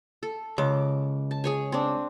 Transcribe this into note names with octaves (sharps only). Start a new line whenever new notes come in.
A4
C#2 D6
A5
G#4 C#5 G#5
C4 D4